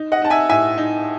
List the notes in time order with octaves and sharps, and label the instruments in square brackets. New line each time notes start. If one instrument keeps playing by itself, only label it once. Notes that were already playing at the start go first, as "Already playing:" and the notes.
Already playing: [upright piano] D#4
D#5 F#5
D#4 A5
E5 G#5
A2 E5 G#5
D#4